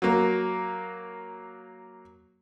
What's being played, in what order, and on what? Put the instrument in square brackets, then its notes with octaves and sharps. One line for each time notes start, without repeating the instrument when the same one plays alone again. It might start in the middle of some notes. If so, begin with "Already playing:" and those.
[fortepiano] F#3 A#3